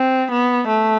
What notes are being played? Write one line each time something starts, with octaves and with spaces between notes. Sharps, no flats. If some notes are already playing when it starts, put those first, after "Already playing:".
Already playing: C4
B3
A3